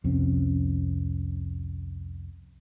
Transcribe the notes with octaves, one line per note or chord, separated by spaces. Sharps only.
C2 F2 C4 C#4